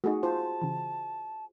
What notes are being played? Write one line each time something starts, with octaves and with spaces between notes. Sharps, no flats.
A3 D#4 F#4 G#4
F4 C5 A5
C#3 E3